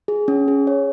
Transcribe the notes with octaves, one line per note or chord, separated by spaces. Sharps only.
G#4
C#4
G#4
C#5